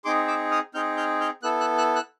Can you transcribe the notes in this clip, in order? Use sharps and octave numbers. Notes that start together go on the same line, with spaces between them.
C4 D#4 G#4 C6 D6
D6 E6
D#6 F6
C4 D#4 G#4 F6 G6
F6 G6
F6 G6
B3 E4 A4 E6 F#6
E6 F#6
E6 F#6
E6 F#6